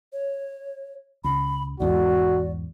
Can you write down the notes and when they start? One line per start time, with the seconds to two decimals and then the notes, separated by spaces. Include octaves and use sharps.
0.13 C#5
1.24 C#2 B5
1.80 B1 E2 G#2 F#4 D5